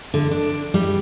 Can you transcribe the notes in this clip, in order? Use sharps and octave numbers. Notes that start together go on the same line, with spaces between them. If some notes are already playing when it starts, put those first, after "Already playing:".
D3
D4
G3